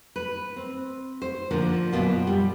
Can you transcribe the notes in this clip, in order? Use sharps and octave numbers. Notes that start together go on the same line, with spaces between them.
B4
C4
C5
D3 F3 A#3 D4
F#2 B2 F4
G3